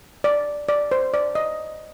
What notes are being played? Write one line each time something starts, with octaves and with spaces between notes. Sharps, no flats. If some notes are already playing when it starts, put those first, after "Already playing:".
D5
D5
C5
D5
D#5